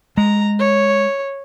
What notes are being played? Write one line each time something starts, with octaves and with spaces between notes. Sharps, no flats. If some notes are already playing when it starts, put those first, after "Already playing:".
G#3 A#5
C#5